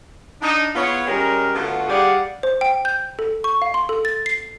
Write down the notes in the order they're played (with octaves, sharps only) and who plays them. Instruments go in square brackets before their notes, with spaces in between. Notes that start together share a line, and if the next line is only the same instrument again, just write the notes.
[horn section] D4 D#4
B3 E4 F4 G#4 C#5
G3 G#3 C#4 A#4
D3 A3 B3 F4 F#4
G3 G4 G#4 D5 F5 F#5
[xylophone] C5
G5
G6
A4
C#6
F5
C6
A4
A6
C7